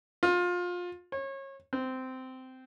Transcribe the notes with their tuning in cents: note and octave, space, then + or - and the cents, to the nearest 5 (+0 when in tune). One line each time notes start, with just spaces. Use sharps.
F4 +25
C#5 -30
C4 -15